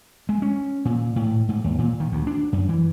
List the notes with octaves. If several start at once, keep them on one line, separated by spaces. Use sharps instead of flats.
G#3
C#4
A#2
A2
G#2
D#2
A#2
D#3
D2
D4
F#2
E3